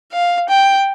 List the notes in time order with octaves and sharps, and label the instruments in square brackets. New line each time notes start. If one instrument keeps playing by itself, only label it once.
[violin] F5
G5